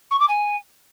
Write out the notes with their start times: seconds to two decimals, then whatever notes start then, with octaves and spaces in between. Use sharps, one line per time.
0.11 C#6
0.20 D6
0.29 G#5